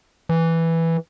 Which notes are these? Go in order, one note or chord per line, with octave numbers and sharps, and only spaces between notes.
E3